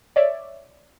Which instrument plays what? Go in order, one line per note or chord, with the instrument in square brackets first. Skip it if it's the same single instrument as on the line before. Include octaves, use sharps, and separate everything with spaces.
[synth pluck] C#5 D5 E5